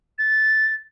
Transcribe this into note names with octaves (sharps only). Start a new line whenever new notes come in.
A6